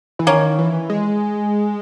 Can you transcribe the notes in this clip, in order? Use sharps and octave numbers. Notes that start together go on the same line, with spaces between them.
E3
D#3 A#3 C#4
E3
G#3